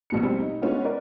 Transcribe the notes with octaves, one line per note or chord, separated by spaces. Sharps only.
A#1 B2 C#7
G3 C4
D#4
G#3 B3 C#4 D4 F4 F#4
A#4 B4 D5